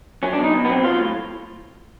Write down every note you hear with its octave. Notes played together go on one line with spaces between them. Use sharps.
F#3 C#4
D4
B2 D#4
B2
B3
F#3 C4
F#3 F4
A2